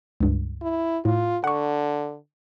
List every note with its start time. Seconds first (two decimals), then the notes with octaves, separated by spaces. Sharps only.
0.20 C#2 G2
0.62 E4
1.05 A2 F4
1.44 D3 F#5 C#6